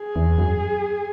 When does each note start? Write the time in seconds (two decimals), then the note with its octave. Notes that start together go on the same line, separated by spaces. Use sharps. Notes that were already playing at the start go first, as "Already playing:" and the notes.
Already playing: G#4
0.16 E2
0.38 F#2